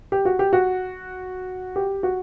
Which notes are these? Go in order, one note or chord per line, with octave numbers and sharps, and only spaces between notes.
G4
F#4
G4
F#4
G4
F#4